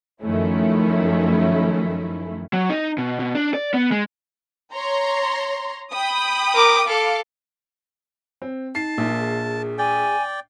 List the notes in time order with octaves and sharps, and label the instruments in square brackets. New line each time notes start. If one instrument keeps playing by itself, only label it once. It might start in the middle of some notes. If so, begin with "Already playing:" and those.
[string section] F#2 D#3 F3 A3 C#4 E4
[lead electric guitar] F#3
D#4
B2
B2
D4
D5
B3
G#3
[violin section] C#5 A#5 C6
G5 B5 D#6
[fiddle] A#4 D6
[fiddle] A4 [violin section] F5 D6
[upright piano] C4
[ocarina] D#4 [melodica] A5 [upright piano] C7
[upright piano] A#1 A#2
[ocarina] G#4
[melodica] D5 G5 [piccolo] G#5